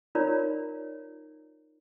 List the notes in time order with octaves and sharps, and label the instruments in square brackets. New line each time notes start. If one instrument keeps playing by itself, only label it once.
[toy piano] D#4 F4 A#4 C#5 D5 A#5